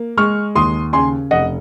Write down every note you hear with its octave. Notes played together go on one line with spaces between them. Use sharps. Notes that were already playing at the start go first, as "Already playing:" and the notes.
Already playing: A#3
G#3 C#6 F6
D#2 C6 D#6
C#3 G#5 C6
F1 D#5 F#5